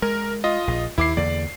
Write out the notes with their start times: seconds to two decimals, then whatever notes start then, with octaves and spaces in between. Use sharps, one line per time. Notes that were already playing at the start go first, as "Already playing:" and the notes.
0.02 G#3 A#4
0.44 F4 D#5
0.67 A#1
0.98 D#2 E4 D6 C7
1.17 E2 D3 A#3 D5